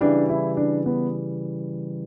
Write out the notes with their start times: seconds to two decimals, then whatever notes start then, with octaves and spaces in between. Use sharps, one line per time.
0.01 C#3 E3 G3 D4
0.29 E4
0.57 D4
0.86 B3